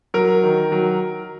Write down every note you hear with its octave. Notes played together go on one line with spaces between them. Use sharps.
F#3 A#4
D#3
F#3